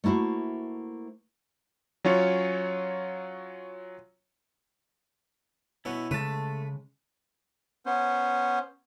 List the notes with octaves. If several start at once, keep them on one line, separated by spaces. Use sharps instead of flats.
A3 A#3 E4 F#4 C5
F#3 C#4 F4 C#5
B2 C#4 E4 F#4
C#3 G#3 A3 B4 A5
B3 C#4 C5